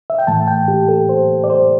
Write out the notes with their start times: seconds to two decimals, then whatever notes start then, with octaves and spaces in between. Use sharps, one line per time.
0.10 E5
0.18 G5
0.27 A2 E3 A3 A5
0.48 G5
0.68 G4
0.89 A4
1.09 C5
1.44 D5
1.50 C5